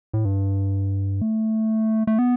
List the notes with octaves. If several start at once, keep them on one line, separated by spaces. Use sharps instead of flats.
A2
G2
A3
A3
B3